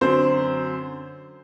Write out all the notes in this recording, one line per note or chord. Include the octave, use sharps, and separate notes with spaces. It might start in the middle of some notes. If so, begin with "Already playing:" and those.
F#2 D3 F#3 C4 C5